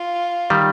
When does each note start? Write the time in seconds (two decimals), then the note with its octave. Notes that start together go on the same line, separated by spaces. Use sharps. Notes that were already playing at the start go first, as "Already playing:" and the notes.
Already playing: F4
0.50 D#3 G3